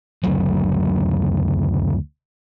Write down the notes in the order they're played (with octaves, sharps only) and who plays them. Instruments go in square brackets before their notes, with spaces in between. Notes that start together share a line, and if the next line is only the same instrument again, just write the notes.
[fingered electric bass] F#1 D2 F#3